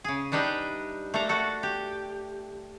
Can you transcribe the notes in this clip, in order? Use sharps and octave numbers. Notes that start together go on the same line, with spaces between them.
C#3 G#4
G3 D4 D#4 G4 B4 E5
A3 A#3 D4 A4 A#5
A3 F#4 A4
G4